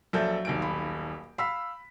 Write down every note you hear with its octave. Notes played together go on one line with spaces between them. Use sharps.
A#1 F#3 A4 E5 G6
D#1 B1 D7
B5
F5 B5 E6 B6